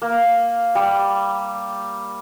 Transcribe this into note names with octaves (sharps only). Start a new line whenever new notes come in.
A#3
G3